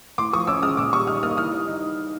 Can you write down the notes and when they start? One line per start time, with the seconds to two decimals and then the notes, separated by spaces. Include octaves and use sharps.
0.18 A2 C6 D6
0.33 F3 C#6 D#6
0.47 C#4 D6 E6
0.63 G#3 D#6 F6
0.77 A#2 D6 E6
0.93 G3 C#6 D#6
1.07 D#4 D#6 F6
1.23 A#3 D#6 F6
1.37 E3 D#6 F6
1.52 G3
1.68 D#4